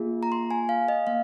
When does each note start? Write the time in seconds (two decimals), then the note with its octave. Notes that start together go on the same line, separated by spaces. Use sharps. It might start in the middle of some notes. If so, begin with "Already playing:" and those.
Already playing: A#3 F4 G#4
0.23 A#5
0.32 C6
0.51 G#5
0.69 F5
0.88 D#5
1.07 A#3 F5